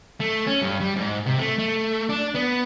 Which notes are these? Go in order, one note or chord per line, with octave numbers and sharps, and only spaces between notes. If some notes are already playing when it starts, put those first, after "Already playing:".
A3
C#4
G2
G3
G#2
C3
A3
A3
D4
B3